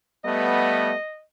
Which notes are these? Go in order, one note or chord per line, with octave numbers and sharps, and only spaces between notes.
G3 A3 B3 D#5